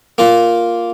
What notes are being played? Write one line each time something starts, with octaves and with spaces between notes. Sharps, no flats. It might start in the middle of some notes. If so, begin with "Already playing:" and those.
A#3 F4